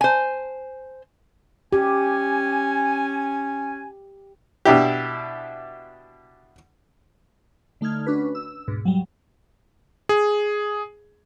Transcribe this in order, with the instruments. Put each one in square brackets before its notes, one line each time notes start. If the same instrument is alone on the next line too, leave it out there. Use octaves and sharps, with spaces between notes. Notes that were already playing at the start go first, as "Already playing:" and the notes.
[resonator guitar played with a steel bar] C5 G#5
[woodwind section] C#4 G#5 [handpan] G4
[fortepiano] B2 D4 E4 G4
[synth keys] D3 A3 D#4 F6 G#6
C#4 D4 F#4 B4
E6
D2 G#2 B2
F#3 G3
[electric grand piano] G#4